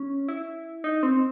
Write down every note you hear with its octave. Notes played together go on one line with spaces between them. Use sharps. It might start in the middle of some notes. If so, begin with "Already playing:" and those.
Already playing: C#4
E4
D#4
C4